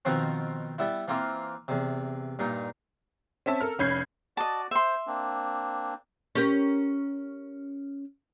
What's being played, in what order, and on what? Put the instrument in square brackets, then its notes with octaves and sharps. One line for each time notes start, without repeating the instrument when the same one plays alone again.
[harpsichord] B2 D#3 F3 B3 C4
G3 B3 E4
E3 A#3 C4 F4
E2 C3
G2 A#2 D#4
[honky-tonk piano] C4 C#4 E5 A5
A4 A#4 F6
F1 C#4 B5 G6 G#6 C7
[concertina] F#4 D5 [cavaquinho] D#5 A5
[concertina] C5 [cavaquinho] E5 C6
[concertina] A#3 C4 D4
[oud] C#4 G4 A#4